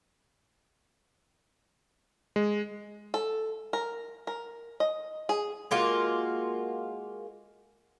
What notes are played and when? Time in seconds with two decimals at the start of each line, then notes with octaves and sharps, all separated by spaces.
2.36 G#3
3.14 A4
3.73 A#4
4.27 A#4
4.80 D#5
5.29 G#4
5.71 G#3 A#3 F4 F#4